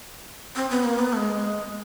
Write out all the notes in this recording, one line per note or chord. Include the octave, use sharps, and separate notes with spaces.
C4
B3
A#3
B3
A3
G#3